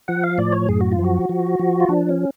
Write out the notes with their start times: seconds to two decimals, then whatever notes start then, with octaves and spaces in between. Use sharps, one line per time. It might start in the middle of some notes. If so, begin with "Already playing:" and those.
0.08 F3 F#5
0.24 F5
0.38 A2 D5
0.53 C#5
0.68 F#2 G#4
0.81 F#4
0.92 F4
0.99 F3
1.04 F#4
1.29 F3
1.59 F3
1.80 F4
1.89 F3 D4
2.09 C#4